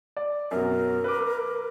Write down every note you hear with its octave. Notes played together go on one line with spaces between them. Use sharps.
D5
F#2 B2 A#4
B4 D6